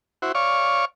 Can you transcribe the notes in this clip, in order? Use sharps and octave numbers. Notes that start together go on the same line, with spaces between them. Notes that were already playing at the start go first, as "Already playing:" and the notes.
E4 F#4 C5
C#5 D5 F5 C#6